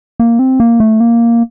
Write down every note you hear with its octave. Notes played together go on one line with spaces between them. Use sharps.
A#3
C4
A#3
A3
A#3